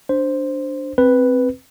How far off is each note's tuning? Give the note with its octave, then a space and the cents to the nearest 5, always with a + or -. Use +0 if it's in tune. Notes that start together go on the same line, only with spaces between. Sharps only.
D4 -5 C5 +0
C4 +0 B4 +0